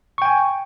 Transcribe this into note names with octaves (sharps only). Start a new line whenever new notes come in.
G5 G#5 C#6